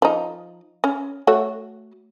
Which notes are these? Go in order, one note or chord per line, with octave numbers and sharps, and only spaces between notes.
F3 D#4
C#4
A3 F#4 C#5